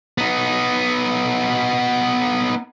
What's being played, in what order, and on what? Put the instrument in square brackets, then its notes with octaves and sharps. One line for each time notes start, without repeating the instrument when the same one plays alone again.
[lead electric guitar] B3 D#4